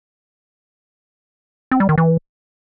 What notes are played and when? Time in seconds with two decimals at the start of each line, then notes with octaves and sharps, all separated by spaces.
1.71 C4
1.80 G3
1.89 D#3
1.98 E3